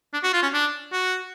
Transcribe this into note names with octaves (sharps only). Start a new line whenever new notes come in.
D4
F#4
F4
C#4
D4
F#4